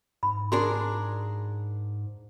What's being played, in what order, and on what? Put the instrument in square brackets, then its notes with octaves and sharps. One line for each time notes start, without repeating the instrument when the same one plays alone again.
[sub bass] G#2 [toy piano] B5
[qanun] D4 G#4 A#4 [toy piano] F#4 G#5 C6